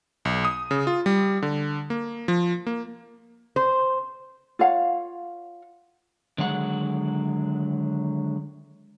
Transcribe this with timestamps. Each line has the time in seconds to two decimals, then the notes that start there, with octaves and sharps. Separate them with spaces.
0.25 B1
0.45 D#6
0.71 C#3
0.87 F4
1.06 G3
1.42 D3
1.90 A#3
2.28 F3
2.67 A#3
3.56 C5
4.59 F4 C#5 F5 F#5
6.38 D3 D#3 F#3 G#3 F#5